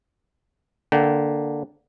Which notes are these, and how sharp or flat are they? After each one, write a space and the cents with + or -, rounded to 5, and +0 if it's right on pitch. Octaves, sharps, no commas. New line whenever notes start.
D3 +0 A#3 +0 G5 -35